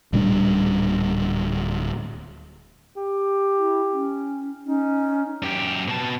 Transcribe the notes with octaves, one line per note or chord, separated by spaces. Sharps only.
D1 A#2 G3 D4
G4
E4
C#4
C#4 D#4
F#2 G4
B2 A5